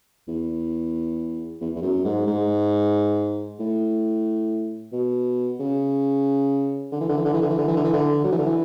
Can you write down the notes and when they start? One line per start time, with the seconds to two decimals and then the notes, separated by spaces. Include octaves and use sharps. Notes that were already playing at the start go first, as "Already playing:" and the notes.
0.28 E2
1.61 E2
1.75 E2
1.82 F#2
2.05 G#2
2.27 G#2
3.59 A2
4.92 B2
5.59 C#3
6.92 D3
7.00 E3
7.09 D3
7.17 E3
7.25 D3
7.33 E3
7.42 D3
7.50 E3
7.58 D3
7.68 E3
7.76 D3
7.84 E3
7.93 D3
8.24 F#3
8.32 E3
8.38 D3
8.46 E3